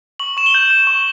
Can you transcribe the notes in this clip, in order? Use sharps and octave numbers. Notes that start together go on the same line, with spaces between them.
C#6 F#7
C#6 E7
G7
G6 F#7
G6 E7
C#6